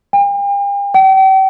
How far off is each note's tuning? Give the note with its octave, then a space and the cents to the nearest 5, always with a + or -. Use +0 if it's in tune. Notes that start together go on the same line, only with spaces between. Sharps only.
G5 +45
G5 -40